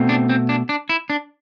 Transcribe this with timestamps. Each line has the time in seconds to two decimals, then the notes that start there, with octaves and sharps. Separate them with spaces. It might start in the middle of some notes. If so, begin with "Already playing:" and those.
Already playing: B2 A3 C4
0.09 D4
0.29 C4
0.49 D4
0.69 D4
0.89 E4
1.10 D4